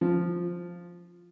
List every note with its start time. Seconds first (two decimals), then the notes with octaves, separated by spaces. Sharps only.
0.01 F3